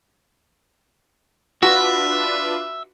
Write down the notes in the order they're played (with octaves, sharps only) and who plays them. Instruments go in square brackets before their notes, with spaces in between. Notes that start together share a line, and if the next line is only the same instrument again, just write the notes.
[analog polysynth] D4 F4 B4 [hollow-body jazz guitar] F#4 [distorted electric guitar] E5